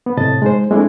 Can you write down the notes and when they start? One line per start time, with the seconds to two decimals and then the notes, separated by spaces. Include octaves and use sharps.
0.06 B3
0.17 A2 C3 D#5 A5 A6
0.42 G#3 D#4 C5
0.71 G#3 A3 C4 D4 E4